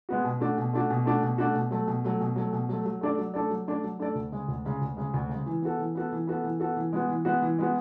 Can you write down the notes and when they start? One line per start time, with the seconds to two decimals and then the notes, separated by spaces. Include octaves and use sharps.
0.09 G#3 B3 F#4
0.24 B2
0.40 A3 D4 F#4
0.58 B2
0.73 A3 D4 F#4
0.90 B2
1.06 A3 D4 F#4
1.23 B2
1.38 A3 D4 F#4
1.55 B2
1.71 F#3 A3
1.88 B2
2.04 F#3 A3
2.20 B2
2.36 F#3 A3
2.53 B2
2.69 F#3 A3
2.86 F#3
3.01 A3 D4 A4 D5
3.18 F#3
3.34 A3 D4 A4 D5
3.50 F#3
3.68 A3 D4 A4 D5
3.84 F#3
3.99 A3 D4 A4 D5
4.15 D2
4.32 C#3 G#3
4.48 D2
4.65 C#3 G#3
4.81 D2
4.97 C#3 G#3
5.14 D2
5.29 C#3 G#3
5.46 E3
5.62 B3 F#4 A4
5.79 E3
5.95 B3 F#4 A4
6.12 E3
6.27 B3 F#4 A4
6.43 E3
6.60 B3 F#4 A4
6.76 E3
6.93 G#3 B3 F#4
7.09 E3
7.25 G#3 B3 F#4
7.42 E3
7.59 G#3 B3 F#4